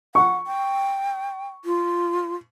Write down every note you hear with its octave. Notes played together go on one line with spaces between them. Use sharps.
F#5 C#6
G5
F4